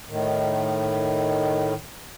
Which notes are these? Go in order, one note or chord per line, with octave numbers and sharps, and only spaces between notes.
A2 D#3